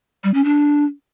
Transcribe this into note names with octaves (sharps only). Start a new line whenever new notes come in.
G3
C#4
D4